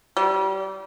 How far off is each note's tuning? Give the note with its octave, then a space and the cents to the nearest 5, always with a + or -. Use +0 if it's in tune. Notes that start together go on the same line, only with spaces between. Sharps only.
G3 -30